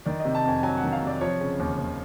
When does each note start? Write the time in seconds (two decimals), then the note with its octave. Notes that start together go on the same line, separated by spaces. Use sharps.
0.06 D#3 D5
0.20 D#5
0.25 C3
0.35 A5
0.45 F2 G#5
0.63 F#3 G#5
0.77 F#5
0.83 D#3
0.92 F5
1.03 C3 D5
1.21 F3 C#5
1.40 C#3
1.60 D#2
1.78 D#2